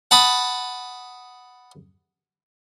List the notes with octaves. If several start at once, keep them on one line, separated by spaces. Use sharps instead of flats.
F#5 A5 B5 D#6